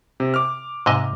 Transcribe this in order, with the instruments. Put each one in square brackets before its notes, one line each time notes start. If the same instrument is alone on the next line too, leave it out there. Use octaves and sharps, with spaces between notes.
[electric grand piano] C3
D6 F6
[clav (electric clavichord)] G#2 C3 D#5